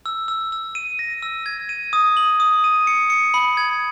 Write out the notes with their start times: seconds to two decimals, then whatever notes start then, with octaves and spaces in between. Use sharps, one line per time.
0.06 E6
0.28 E6
0.52 E6
0.75 D#7
0.99 A#6
1.22 E6
1.46 G#6
1.69 D#7
1.93 D#6
2.17 F#7
2.40 D#6
2.64 D#7
2.87 C#7
3.10 C#7
3.34 B5
3.57 G#6